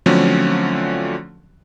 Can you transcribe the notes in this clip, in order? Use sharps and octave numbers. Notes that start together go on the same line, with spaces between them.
D3 F3 F#3 A3 C4 C#4